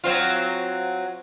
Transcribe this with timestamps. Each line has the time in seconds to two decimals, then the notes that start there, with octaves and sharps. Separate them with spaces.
0.04 F#3 C4 F4